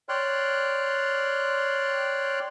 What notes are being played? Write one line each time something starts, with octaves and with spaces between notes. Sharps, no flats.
C#5 D5 G5 C6 F6 F#6